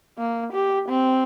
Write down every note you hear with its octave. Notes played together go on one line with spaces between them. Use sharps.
A#3
G4
C4